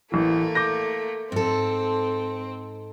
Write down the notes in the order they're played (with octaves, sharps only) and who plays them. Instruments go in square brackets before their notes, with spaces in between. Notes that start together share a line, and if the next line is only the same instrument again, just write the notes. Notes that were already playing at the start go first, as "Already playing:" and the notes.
[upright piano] A1 E3 [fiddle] A3 A#3
[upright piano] D6 G6 A#6
[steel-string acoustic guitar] G#2 A4 [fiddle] C4